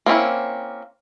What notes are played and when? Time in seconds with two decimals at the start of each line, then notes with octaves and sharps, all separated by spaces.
0.06 A#3 C4 C#4 E4